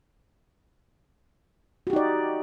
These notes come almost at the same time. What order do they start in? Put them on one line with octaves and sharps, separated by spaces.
F#4 G4 D#4 D5